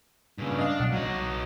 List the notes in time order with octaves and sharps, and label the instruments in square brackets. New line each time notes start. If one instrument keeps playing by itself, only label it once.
[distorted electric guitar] G2 C#3
[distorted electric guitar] D4 [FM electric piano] D#5 F5
[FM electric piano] B1 F#5
[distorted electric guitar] F#3 D#5